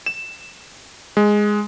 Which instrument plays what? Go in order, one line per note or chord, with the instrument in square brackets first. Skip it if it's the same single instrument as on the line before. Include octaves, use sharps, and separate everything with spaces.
[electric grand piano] E7
G#3